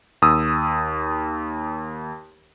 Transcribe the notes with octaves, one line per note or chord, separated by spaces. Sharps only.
D#2 D#6 E6